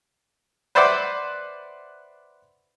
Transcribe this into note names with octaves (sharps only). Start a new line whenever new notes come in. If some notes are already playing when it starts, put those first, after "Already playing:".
B4 C5 D5 E5 F#5 D6